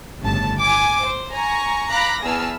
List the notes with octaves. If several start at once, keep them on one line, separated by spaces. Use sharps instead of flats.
G1 A2 C#3 A5
G#5 D6
C5
G#5 A#5 C#6
F5 A#5 B5 D6 F#6 A#6
E2 G#4 B4 A5 E6 F6